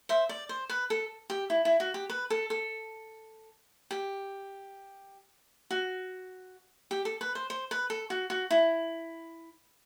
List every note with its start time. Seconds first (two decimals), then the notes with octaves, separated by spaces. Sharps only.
0.09 C5 E5
0.29 D5
0.49 C5
0.69 B4
0.90 A4
1.30 G4
1.50 E4
1.65 E4
1.80 F#4
1.94 G4
2.10 B4
2.30 A4
2.50 A4
3.91 G4
5.71 F#4
6.91 G4
7.05 A4
7.21 B4
7.35 C5
7.50 C5
7.71 B4
7.90 A4
8.10 F#4
8.30 F#4
8.51 E4